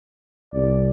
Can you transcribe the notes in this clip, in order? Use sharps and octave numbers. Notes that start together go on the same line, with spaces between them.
C2 D5